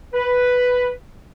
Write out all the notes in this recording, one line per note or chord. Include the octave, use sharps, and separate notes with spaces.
B4